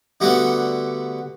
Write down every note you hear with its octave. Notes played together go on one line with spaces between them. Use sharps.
D3 G3 A3 B3 F#4 G4